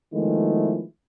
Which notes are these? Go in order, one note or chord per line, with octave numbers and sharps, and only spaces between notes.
D#3 F3 G#3 A3 B3 E4